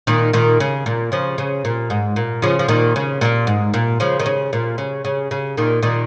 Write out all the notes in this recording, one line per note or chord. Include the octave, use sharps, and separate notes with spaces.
A#2 D#3
A#2 D#3
C#3
A#2
C#3 F3
C#3
A#2
G#2
A#2
C#3 F3
F3
A#2 D#3
C#3
A#2
G#2
A#2
C#3 F3
D#3
C#3
A#2
C#3
C#3
C#3
A#2 D#3
A#2 D#3